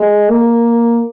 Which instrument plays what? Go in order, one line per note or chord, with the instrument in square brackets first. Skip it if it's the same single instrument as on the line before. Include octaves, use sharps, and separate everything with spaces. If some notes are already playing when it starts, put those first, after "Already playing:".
Already playing: [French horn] G#3
A#3